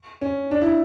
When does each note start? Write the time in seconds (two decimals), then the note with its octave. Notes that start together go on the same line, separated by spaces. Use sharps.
0.21 C#4
0.51 D4
0.62 E4